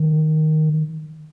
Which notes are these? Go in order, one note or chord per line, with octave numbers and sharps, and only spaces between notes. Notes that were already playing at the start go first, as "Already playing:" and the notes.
Already playing: D#3